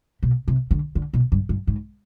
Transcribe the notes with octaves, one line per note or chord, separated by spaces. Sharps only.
B2
C3
D3
D3
B2
G2
G2
G#2